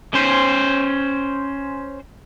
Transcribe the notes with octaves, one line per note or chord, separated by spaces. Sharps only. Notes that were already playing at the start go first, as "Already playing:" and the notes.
C#4 C5